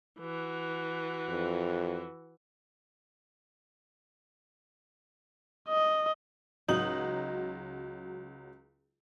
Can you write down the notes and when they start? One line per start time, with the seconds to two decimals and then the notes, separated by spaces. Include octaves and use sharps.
0.20 E3 F#4
1.29 F2
5.69 D#5
6.68 C#2 F#3 D#4 F#7